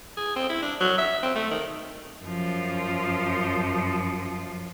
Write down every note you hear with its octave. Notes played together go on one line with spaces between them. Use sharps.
G#4
C4
E4
D4
F#3
E5
C4
A3
D#3
F#2 F3